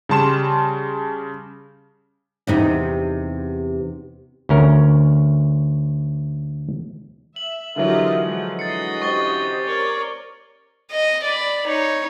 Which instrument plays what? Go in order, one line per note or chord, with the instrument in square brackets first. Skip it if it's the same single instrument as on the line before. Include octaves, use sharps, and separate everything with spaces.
[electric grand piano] C#3 G3 A5 C6 E7
[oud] E2 C3 D#4
[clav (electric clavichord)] D2 C#4 A#4
[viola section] E5 [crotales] F#7
[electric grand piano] D3 E3 F#3 [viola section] F4 G4 D#5 [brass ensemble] A#4 E5
[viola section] F3 [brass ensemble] G#3
[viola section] F#4 D#5 [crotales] A6 C7 C#7
[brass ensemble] C#4 G4 C5 [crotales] C#6 A6 G7
[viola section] A#4 C#5 D5
[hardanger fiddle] D#5
D5 B5
D#4 C#5